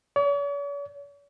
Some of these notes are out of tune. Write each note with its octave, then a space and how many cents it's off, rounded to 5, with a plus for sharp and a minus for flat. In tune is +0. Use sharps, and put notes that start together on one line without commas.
C#5 +45